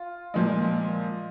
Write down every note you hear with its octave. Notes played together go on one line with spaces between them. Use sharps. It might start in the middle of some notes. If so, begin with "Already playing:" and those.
Already playing: F4
A#2 F3 G#3